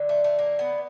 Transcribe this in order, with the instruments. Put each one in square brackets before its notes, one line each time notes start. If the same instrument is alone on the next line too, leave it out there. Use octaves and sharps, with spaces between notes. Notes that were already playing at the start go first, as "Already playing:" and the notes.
Already playing: [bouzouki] D3 F#3
A3
A3
A#3
B3